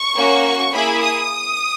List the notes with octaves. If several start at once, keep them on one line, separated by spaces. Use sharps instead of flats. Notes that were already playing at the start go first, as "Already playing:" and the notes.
Already playing: C#6
A#3 C#4 F#4
A#3 E4 G#4 B5
D#6